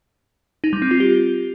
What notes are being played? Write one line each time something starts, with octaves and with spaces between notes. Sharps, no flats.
D#4
G3
C4
F4
G4